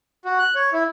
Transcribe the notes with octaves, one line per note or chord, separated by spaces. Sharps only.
F#4
F#6
C#5
E4